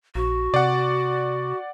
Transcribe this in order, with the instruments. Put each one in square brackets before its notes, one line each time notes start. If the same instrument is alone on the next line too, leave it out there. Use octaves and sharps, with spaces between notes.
[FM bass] A#1 [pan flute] F#4
[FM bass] C3 [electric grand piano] D5 F#5